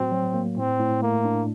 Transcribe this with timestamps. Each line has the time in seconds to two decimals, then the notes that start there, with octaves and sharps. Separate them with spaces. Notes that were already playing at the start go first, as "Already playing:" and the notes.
Already playing: A2 F#3 A3 C4 F#4
0.12 F#3
0.34 A#3
0.57 A2 C4
0.80 A2
1.02 A3 A#3
1.25 D4